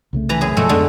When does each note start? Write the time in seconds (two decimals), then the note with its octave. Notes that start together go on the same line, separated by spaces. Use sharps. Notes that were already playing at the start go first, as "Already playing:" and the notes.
0.13 C2 C#3 A3
0.29 E3 B4 A#5
0.41 F#2 G#4
0.56 G2 B2 F3 G#3 A3 F#4
0.69 F2 D3 G#3 A3 B3